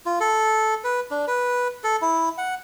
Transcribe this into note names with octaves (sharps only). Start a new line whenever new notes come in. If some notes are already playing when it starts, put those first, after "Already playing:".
F4
A4
B4
D4
B4
A4
E4
F#5